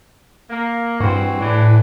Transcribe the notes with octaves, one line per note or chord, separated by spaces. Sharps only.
A#3
G2 E3 C4 F#4
A2 E3 D4